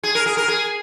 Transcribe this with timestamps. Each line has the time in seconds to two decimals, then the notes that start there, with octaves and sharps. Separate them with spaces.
0.03 G#4
0.15 A#4
0.26 G#4
0.37 A#4
0.48 G#4